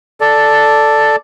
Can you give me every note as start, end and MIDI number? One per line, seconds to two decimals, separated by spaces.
0.20 1.16 69
0.20 1.16 74